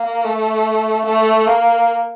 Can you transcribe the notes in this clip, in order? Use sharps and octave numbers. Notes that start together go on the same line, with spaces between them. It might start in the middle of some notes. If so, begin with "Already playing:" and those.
Already playing: A#3
A3
A3
A#3